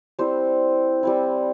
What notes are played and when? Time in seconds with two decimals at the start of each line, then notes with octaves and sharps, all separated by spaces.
0.19 G3 C4 E4 C5
1.03 G3 C4 E4